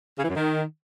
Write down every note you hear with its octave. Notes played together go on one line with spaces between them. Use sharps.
C#3
E3
F#2
D#3